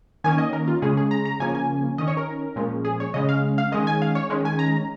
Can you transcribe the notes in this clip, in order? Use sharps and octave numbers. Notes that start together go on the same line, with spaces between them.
D#3 A#3 C#4 G#5
D#5
A#4
F4
C#3 G#3 C#4 G#4
G#4
A#5
A#5
C#3 F3 A#3 C#4 G#5
G#5
D#3 C#4 D#5
C#5
A#4
A#2 F3 G#3 C#4
G#4
C#5
C#3 G#3 C#4 D#5
F5
F5
D#3 G#3 C#4 D#5
G#5
F5
C#5
D#3 G#3 C#4
G#5
A#5